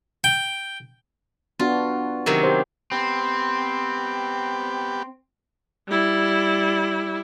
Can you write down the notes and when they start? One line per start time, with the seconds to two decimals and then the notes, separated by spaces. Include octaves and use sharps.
0.24 G5
1.59 B3 D4 F4 F#4
2.26 C3 D#3 F#3
2.43 G4 C5
2.92 B3 C4 G4
5.88 G3 E4